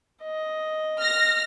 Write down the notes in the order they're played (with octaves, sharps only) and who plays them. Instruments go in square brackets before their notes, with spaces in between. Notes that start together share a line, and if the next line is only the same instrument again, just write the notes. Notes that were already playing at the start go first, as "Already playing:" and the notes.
[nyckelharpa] D#5
[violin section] F6 A#6